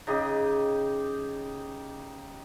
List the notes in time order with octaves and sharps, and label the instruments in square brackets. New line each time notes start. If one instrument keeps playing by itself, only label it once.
[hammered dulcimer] C#3 D#4 G4 D#5